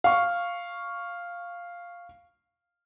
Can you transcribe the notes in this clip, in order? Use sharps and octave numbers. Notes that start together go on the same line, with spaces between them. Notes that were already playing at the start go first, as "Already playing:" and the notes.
F5 C#6